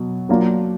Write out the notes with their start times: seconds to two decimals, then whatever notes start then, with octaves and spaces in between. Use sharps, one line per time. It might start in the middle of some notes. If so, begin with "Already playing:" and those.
Already playing: B2 F#3
0.29 F#3 A#3 D4 F4